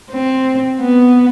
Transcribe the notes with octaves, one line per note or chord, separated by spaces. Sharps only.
C4
B3